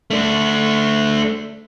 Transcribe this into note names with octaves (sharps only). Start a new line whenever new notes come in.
A3 D4